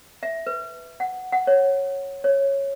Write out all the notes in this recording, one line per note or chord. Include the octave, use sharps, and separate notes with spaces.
E5
B4
F#5
F#5
C#5
C#5